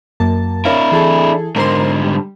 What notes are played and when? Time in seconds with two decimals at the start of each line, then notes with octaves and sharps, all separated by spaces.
0.20 F#2 A#3 A5
0.65 D4 E4 A#4 C#5 F5
0.92 E3 G#4 A4
1.56 G#2 D3 A#4 C5 C6
2.04 G3